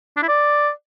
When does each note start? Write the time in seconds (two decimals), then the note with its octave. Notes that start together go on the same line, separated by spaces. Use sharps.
0.17 D4
0.22 E4
0.28 D5